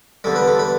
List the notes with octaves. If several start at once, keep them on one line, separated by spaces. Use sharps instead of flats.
E2 D3 G3 A4
B4
A4
B4